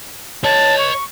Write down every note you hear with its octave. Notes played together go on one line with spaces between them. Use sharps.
C#5 D#5 A5
C#6